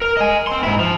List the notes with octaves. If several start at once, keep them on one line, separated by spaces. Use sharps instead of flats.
A#4
D#5 G#5
C4 C6
G#2 E4
F3